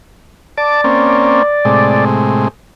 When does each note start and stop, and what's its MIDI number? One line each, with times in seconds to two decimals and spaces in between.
0.58 2.05 74
0.58 0.81 81
0.58 0.81 86
0.84 1.43 58
0.84 1.43 60
0.84 1.43 61
1.65 2.48 45
1.65 2.48 48
1.65 2.48 56